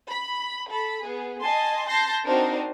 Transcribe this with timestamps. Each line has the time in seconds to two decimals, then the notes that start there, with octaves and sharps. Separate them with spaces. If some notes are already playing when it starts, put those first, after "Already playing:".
0.10 B5
0.68 A4 B5
1.02 B3 G#4
1.40 D#5 G#5 A5 C6
1.88 A5 C6 G6 A#6 C7
2.25 C4 D4 D#4 F#4 A#4 C5